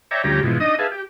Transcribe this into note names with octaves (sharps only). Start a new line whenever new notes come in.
C#5 D5 E5 G5 A#5
D2 F3 G3 C#4 G4 A#5
G#2 B2 E3 F3
D4 D#4 D#5 D#6
G#4 B4 E5 F5 A5
G4